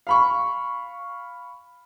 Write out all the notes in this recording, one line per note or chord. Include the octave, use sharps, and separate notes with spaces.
F5 B5 C#6